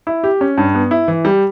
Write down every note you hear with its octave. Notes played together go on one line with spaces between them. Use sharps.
E4
G4
C#4
G2
B3
E4
E3
G3